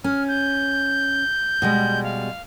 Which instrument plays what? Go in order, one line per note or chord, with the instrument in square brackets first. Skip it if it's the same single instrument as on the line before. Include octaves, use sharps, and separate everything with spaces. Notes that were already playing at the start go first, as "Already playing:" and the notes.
[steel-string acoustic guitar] C#4 [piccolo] F6
[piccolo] G6
[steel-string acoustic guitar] B2 G3 G#3
[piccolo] F5